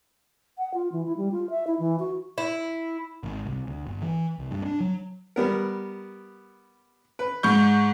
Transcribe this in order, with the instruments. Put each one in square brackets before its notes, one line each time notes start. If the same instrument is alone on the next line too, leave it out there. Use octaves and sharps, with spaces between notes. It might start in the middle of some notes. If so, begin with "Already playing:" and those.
[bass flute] F#5
F4
E3
E4
G3
F4
E5
E4
E3
F#4
[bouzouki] E4
[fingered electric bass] G#1
C2
D2
G1
E3
C2
G2
D4
F#3
[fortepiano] G3 B3 A#4
B4
[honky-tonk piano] G#2 C#6 G6